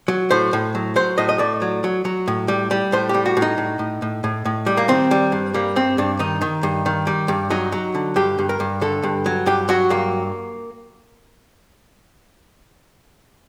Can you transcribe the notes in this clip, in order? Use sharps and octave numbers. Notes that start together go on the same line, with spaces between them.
F#3
A2 C5
A2
F#3
F#3 C5
A2 D#5
D#5
A2 D5
F#3
F#3
F#3
A2
G3
G3
A2 C5
G4
G3
F#4
A2
D#4
A2
A2
A2
A2
A2
G3
A#3
D#3 C4
G3
G2
G3 A#3
G2 C4
G2 D4
D#3 D#4
D#3
G2
D#3
G3
G2
F#3 D#4
F#3
D3
G2 G4
G2
A#4
G2
D3 A4
G2
F#3
G2 G4
F#3 F#4
G2 A#3